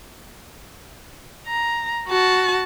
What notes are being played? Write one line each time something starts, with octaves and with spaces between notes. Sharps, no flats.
A#5
F#4 A5